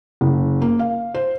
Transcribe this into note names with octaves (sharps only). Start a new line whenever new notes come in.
F#1
A#3
F5
C5